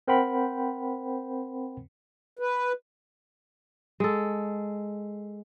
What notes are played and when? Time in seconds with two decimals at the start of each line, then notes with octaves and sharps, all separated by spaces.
0.08 C4 A#4 C5 F#5 G5 B5
2.39 B4
4.00 G#3 A4